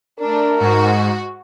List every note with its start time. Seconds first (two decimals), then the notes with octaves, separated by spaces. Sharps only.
0.20 A3 D4 A#4
0.60 G#2 F#4